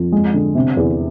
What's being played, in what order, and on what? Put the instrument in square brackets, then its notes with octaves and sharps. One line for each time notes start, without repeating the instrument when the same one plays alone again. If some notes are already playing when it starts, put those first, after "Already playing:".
Already playing: [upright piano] F2
G#3
D3
C3
E2